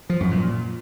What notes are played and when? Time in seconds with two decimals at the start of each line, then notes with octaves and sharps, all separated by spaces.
0.10 F3
0.20 F#2
0.31 A#2